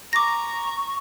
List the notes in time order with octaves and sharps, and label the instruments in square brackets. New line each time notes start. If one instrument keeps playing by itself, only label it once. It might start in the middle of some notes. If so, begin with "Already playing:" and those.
[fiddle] A#5 [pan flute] C#6 [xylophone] D6 A#6